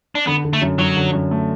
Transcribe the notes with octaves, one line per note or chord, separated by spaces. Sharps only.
D4
D3 B3
D3
A3
F#2
F#2 F#3
D3
F#2
A3